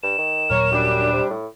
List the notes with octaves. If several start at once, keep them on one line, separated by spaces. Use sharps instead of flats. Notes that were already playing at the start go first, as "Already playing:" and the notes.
G2 E7
D#3
D#2 A#2 F#3 A#4 C#5
F#2 G3 D4
C3
A2